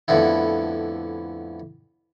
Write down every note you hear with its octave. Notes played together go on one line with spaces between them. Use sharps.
F2 A2 D3 B3 E4